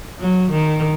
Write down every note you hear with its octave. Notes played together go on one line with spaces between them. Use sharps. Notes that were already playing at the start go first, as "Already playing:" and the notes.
F#3
D#3